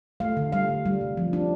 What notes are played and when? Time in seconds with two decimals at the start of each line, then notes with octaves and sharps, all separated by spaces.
0.20 A3 F5
0.37 D3
0.52 G3 F5
0.69 D3
0.85 G3
1.01 C3
1.17 F3
1.33 D4